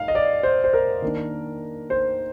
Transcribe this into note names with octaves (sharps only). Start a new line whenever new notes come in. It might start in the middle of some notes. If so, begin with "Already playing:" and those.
Already playing: D#4 F5
D#5
D5
C5
C5
A#4
D#3 A#3 D4
C5